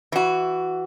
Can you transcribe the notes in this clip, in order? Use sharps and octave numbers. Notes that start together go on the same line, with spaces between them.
E3 F#4